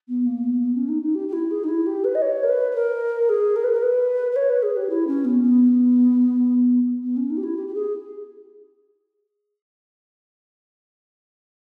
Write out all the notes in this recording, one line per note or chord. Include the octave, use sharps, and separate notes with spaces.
B3
A#3
B3
B3
C#4
D#4
D#4
G4
G4
E4
G#4
D#4
E4
G4
B4
D#5
C#5
A#4
B4
B4
A#4
G#4
A#4
B4
A#4
B4
B4
C#5
B4
G#4
G4
E4
C#4
B3
B3
B3
C#4
D#4
G4
E4
G4
G4
G#4